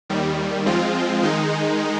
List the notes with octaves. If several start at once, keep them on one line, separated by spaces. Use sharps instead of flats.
D#2 D#3 G3
F3 G#3 C4 F4
D#3 G#3 D#4